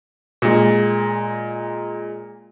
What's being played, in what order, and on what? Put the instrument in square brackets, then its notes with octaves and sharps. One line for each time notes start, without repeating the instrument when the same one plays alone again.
[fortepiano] A#2 G#3